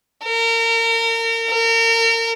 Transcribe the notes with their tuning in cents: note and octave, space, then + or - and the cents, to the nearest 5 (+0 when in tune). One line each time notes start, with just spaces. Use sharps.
A#4 -30
A#4 -30